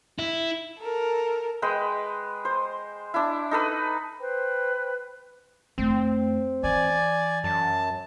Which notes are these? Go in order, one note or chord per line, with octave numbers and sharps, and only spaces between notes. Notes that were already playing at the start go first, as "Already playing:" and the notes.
E4
A4 A#4
G#3 B4 G5
C5
D4 E4
D#4 A4 B4
B4 C5 G5
F2 A3 C4
E3 D5 G#5
F#2 A5